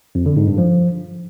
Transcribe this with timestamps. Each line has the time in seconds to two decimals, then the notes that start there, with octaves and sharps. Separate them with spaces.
0.15 F2
0.26 D3
0.37 G#2
0.47 G2
0.58 F3